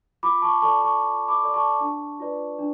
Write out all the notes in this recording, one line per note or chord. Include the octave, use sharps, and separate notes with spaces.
F4 B5 D6
A5 C#6
A4 D5 A5 C#6
A5 C#6
F4
B5 D6
A4 D5
A5 C#6
D4
F4 B4 D5
D4